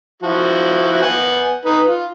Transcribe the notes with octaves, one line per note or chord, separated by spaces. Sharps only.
F3 E4 F#4
B3 F#5 G#5
D#4 B4
F4